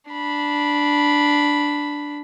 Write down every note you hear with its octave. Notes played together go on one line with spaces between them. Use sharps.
D4 B5